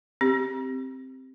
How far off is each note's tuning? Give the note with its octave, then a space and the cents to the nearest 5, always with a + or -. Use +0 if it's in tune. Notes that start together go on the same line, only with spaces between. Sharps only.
C4 +0 G4 +0